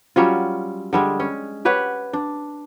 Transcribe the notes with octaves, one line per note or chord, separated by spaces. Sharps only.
F#3 G3 C#4 F4
D3 G3 G#3
C#4
G4 B4 C#5 F#5
D4